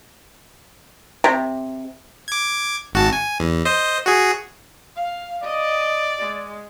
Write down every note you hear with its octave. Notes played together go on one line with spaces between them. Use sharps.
C3
D6 G#6
G#1 F#4 A5
G#5
E2
C5 D#5
F#4 G#4
F5
D5 D#5
G#3